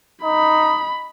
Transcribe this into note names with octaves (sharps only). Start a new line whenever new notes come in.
D#4 B5